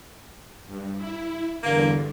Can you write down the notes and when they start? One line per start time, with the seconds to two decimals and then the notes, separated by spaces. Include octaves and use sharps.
0.67 G2
0.97 E4
1.63 E2 G2 D3 A#3